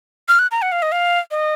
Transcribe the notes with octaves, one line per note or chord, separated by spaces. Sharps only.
F6
F#6
A#5
F#5
F5
D#5
F5
D#5